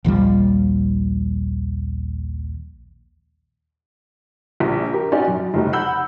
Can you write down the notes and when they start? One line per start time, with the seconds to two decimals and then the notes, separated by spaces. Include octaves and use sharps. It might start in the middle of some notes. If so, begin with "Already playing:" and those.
0.04 A#1 D#2 F3 G3
4.60 A#1
4.93 G4 A#4
5.12 C#4 D#4 F#4 G4 D5
5.28 F#2
5.54 F1 A3 D#4
5.73 F#5 B5 E6 G6